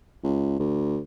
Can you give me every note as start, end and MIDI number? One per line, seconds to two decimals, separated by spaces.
0.24 0.57 37
0.59 0.99 38